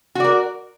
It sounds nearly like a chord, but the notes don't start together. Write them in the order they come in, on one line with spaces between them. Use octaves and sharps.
F#4 D5 A#4